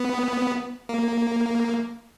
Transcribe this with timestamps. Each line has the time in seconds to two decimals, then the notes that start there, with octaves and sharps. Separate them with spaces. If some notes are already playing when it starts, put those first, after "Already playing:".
Already playing: B3
0.89 A#3